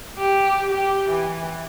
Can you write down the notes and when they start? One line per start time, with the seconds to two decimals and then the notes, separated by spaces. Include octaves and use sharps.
0.18 G4
0.70 G4
1.10 E3